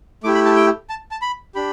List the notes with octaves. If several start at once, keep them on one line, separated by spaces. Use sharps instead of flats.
A3 E4 G4 D6
B5
A5
G5
A5
A5
B5
D4 G4 B5